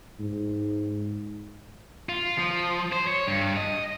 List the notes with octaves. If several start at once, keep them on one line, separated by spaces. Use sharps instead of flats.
G#2
F4
F3
C5
C#5
G2
D#5